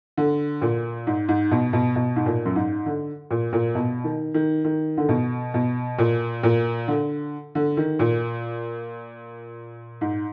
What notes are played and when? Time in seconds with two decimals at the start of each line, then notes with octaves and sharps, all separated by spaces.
0.17 D3
0.62 A#2
1.07 G#2
1.29 G#2
1.51 B2
1.73 B2
1.96 B2
2.16 G#2
2.26 A#2
2.46 F#2
2.56 G#2
2.86 D3
3.31 A#2
3.53 A#2
3.75 B2
4.04 D#3
4.34 D#3
4.65 D#3
4.97 D3
5.09 B2
5.54 B2
5.99 A#2
6.43 A#2
6.88 D3
7.55 D3
7.77 D#3
7.99 A#2
10.01 G#2